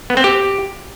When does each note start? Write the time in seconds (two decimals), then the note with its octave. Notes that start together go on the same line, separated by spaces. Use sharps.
0.10 B3
0.17 C4
0.24 G4